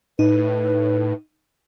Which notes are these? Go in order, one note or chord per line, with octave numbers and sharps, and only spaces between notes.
A2 D#4 B4